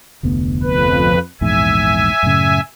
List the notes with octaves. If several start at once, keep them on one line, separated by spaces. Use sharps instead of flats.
F1 D2 B3
F2 B4
A#1 E2 G#2 E5 G#5
F#2 A2 C#3